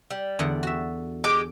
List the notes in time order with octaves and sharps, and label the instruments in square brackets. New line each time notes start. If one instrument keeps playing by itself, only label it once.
[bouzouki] G3
[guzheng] E2 D3 F#5
F#4 E5
[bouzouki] G#3 G4 [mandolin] D6